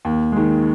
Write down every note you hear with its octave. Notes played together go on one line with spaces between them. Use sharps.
D#2
D#3 G#3